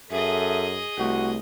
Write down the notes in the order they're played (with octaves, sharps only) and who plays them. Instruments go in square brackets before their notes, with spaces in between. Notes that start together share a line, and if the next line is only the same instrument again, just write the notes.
[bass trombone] F#2 [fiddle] G#4 D#5 [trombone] A4 [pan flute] E5
[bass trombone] C2 [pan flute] A3 [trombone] F#4